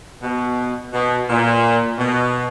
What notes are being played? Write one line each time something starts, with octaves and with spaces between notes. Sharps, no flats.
B2
B2
A#2
B2